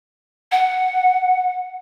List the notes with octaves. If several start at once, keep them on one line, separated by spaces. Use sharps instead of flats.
F#5